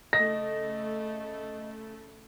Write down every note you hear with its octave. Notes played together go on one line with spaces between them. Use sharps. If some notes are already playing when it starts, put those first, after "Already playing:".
C#3 A3 D#5 A#6